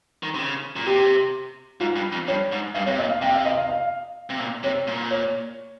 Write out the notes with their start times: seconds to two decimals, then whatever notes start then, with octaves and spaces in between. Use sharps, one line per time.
0.23 D#3
0.35 C3
0.39 C#3
0.76 A#2
0.86 C3 G4
1.80 G#2 F4
1.96 G2
2.12 F2
2.28 G2 C#5
2.52 G#2
2.74 G2 F5
2.86 C3 C#5
2.98 A#2 D#5
3.10 F5
3.22 C3 G5
3.34 F5
3.45 D#5
3.57 F5
3.69 F5
4.30 C3
4.40 A#2
4.63 C3 C#5
4.87 A#2
5.11 C#5